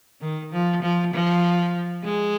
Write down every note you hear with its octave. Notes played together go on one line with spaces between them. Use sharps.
D#3
F3
F3
F3
G#3